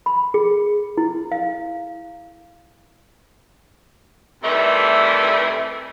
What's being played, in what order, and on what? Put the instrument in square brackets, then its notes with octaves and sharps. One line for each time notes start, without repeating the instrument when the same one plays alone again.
[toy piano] B5
G#4
E4
F5
[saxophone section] A2 C3 D#3 E3 G3 A3